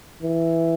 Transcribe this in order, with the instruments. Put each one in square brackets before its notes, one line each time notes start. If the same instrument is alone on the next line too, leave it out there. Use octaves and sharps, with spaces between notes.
[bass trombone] E3